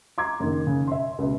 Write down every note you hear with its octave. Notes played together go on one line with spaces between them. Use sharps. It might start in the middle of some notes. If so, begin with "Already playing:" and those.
A#5 C6 D6 G#6
F#1 D#3
C#3
E5 C6
C#2 B2